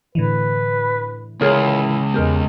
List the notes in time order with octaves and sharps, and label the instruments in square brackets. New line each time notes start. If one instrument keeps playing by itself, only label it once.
[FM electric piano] A2 D3 E3 [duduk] B4
[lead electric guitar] C#2 [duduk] E4 [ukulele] G#4 A#4 C#5
[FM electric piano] E2 B3 [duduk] G#3 [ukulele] G4 A#4